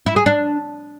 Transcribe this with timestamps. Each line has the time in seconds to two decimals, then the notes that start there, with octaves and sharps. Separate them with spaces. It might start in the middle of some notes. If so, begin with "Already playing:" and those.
0.06 E4
0.16 G#4
0.26 D4